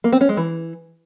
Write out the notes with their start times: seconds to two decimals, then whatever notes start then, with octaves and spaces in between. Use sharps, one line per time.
0.04 A#3
0.13 C4
0.21 C#4
0.29 G#3
0.37 E3